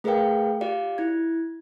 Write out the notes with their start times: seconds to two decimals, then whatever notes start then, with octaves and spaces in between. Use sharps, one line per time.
0.04 A3 G#4 A#4 B4 F5 G5
0.61 F4 G4 D5 F5
0.98 E4 G#6